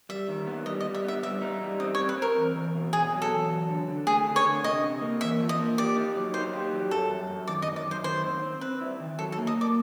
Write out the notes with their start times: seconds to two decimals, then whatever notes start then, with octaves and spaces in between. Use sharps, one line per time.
0.09 G3 E5
0.28 D#3
0.47 B3
0.66 G3 D#5
0.80 D#5
0.85 G3
0.95 E5
1.05 B3 E5
1.23 G3 E5
1.42 D#4
1.61 G3
1.80 C4 D#5
1.95 C#5
1.98 C4
2.09 B4
2.17 C4 A#4
2.37 E2
2.55 E2
2.75 B2
2.93 B2 G#4
3.12 F#3
3.22 A4
3.31 E2
3.50 F#3
3.69 D3
3.88 D3
4.07 A3 G#4
4.26 D3
4.36 C#5
4.45 D3
4.64 C3 D#5
4.83 C3
5.01 A#3
5.21 E2 E5
5.40 F3
5.49 D#5
5.59 A#3
5.78 G4 D5
5.97 D#4
6.16 F#3
6.34 D#4 C5
6.53 G4
6.72 F#3
6.91 F#2 A4
7.10 F#2
7.29 F#2
7.47 D#3 D5
7.62 D#5
7.67 F#2
7.76 D5
7.86 F#2 C5
8.04 D#3 C5
8.24 C4
8.42 C4
8.61 C4 B4
8.81 E4
9.00 D#3
9.19 F#3 A4
9.32 A4
9.37 A#3
9.47 D#5
9.56 A#3
9.61 D5